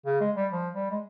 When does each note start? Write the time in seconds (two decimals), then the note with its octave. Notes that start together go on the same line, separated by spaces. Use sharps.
0.06 C#3
0.20 G#3
0.36 G3
0.52 F3
0.74 G3
0.91 G#3